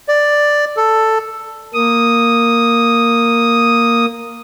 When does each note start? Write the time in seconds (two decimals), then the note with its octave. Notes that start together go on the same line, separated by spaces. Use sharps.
0.08 D5
0.77 A4
1.74 A#3 D#6